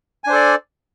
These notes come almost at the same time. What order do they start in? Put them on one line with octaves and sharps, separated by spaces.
G#5 D4 C5 A4 D5